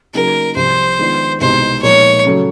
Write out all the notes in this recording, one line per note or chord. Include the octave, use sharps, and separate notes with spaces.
C#3 F#3 A#3 D#4 G#4 A#4
C2 C3 F3 C5
D#3 G#3 B3 D4 F4
C2 B2 G#3 B3 D#4 C5
A#2 F3 G#3 B3 D#4 C#5
C#3 F#3 A3